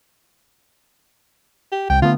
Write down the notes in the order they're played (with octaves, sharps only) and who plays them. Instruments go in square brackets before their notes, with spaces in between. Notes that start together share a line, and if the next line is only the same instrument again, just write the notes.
[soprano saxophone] G4
[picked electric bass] C2 [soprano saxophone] G5
[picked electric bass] D3 A3 B3 [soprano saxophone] F4